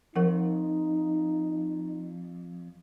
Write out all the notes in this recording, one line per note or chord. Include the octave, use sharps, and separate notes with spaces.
F2 F3 D#4 A#4 F#5